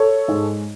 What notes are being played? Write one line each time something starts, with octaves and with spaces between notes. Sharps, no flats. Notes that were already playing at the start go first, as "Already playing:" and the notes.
Already playing: A4 C#5
G#2 G#3